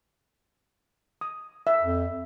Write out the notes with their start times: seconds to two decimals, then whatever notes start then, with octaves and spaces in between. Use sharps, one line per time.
1.21 D#6
1.67 E5
1.82 F2